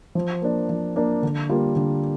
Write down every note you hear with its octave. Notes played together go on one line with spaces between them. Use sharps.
F3
A#3 D4
F3
A#3 D4
D3
G3 A#3 F4 A#4
D3